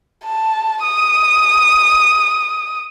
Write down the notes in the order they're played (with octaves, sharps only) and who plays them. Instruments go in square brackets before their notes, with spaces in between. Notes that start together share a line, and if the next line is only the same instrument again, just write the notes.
[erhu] A5
D#6